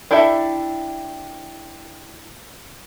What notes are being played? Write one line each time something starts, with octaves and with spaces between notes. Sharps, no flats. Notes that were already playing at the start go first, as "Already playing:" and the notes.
D4 E4 G4 A4 E5